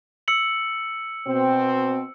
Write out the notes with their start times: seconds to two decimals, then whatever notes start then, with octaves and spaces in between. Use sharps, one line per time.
0.28 E6 C#7 F#7
1.27 B2 C4